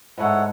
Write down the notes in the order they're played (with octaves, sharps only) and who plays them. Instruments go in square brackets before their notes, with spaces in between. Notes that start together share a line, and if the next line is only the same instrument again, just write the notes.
[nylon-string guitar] G#2 [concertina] E4 A4 C#5 F#5